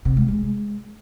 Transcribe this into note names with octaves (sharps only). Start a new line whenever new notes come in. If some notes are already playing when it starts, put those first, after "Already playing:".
C3
G#3
G#3